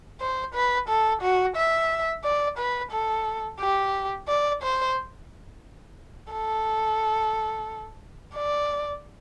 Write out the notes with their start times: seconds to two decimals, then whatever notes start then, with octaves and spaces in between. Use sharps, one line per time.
0.21 C5
0.54 B4
0.89 A4
1.22 F#4
1.56 E5
2.24 D5
2.58 B4
2.92 A4
3.60 G4
4.29 D5
4.63 C5
6.33 A4
8.36 D5